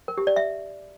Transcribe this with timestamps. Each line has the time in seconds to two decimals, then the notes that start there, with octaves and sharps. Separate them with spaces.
0.08 A#4
0.18 G4
0.27 D5
0.36 E5